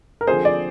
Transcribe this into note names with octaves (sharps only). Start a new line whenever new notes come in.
A#4
D3 F3 C4 G#4 C5
D5